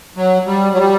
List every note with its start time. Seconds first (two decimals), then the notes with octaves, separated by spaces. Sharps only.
0.17 F#3
0.47 G3
0.73 F#3
0.78 G3